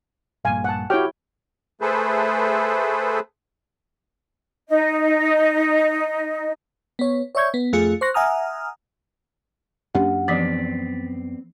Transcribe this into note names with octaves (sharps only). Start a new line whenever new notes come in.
A#1 G2 A#3 F5 G#5
F#5 A5
E4 F#4 G4 C#5 G5 F6
A3 G#4 A4 B4 C5
D#4 D#5
B3 C#5
C#5 D5 E5 C#6 G6 G#6
B3
F2 A3 F4 G#4 C#7
C5 C6 C#6 F#6 A#6
E5 F#5 G#5 A#5 D#6 F6
F#2 A#3 C#4 D4 G4 F#5
E3 F3 B3 C4 D5 A6 B6